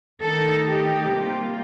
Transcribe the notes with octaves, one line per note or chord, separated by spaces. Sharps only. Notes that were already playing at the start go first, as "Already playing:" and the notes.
D#3 A3 D#4 A4
G4
C3 G3 A#3 F4